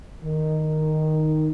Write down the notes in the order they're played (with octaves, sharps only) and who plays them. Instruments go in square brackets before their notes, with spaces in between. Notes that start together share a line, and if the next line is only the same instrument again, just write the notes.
[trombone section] D#3